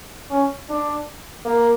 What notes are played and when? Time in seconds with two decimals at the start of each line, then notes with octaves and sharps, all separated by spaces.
0.31 C#4
0.70 D4
1.45 A#3